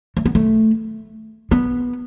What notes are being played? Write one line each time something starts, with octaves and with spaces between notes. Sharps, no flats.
A3
B3
A3
B3